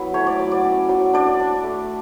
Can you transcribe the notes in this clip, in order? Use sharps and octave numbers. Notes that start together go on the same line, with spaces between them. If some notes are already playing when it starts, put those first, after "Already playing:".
Already playing: F#3 B3 E4 B4
A3 C#5
D5
F#3
D5
C#4
F#3
D4 D5
D4
A3